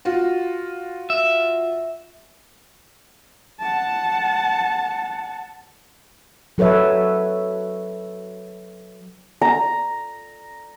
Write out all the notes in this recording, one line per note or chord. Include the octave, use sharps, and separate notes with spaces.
F4 F#4
E5
F#5 A5
F#3 A4 B4 C#5 E5
A#5